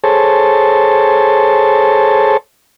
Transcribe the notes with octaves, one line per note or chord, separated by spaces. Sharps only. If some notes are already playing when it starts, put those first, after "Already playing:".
G#4 A4 C5 C#5 A5